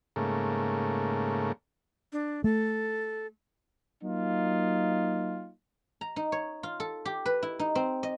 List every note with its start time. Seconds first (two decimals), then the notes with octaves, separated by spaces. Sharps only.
0.16 G#2 C#3 A3 A#3
2.13 D4
2.44 A3 A4
4.03 F#3 A#3 D#4 F4
6.01 A#5
6.16 D#4
6.32 C#5
6.63 F4
6.80 A4
7.05 G4
7.26 B4
7.43 E4
7.59 D#4
7.75 C4
8.03 D#5